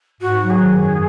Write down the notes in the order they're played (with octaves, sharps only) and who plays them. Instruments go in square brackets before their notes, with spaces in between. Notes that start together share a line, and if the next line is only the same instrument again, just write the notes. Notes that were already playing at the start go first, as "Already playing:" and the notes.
[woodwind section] G#2 [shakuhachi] F#4
[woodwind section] F#3
[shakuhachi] G#4
[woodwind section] D#3
F#2